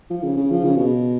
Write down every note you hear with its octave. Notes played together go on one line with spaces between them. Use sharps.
F3
C#3
C#3
F3
C#3
B2